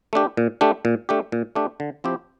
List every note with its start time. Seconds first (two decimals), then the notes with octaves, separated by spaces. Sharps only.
0.13 A3 D4 G4
0.37 A#2
0.61 A3 D4 G4
0.85 A#2
1.09 A3 D4 G4
1.32 A#2
1.55 A3 D4 G4
1.80 D3
2.04 F3 C4 E4 G4